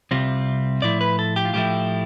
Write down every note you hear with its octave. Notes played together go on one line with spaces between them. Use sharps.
C2 C3 G3 C4 F4
A2 F3 A3 E4 D5
B4
A4
G4
F4
A2 F3 A3 E4 G4